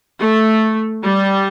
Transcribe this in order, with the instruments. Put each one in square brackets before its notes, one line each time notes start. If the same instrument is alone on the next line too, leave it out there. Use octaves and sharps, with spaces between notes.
[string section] A3
G3